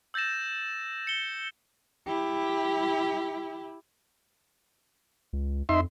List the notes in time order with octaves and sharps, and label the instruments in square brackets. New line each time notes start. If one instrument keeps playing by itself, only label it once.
[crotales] E6 G6 A6 A#6 E7
C#7 G7
[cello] E4 G4
[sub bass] C#2
[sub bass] F2 [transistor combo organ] D#4 E5 C6